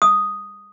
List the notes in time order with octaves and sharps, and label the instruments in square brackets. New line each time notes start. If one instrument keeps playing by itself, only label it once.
[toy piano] D#6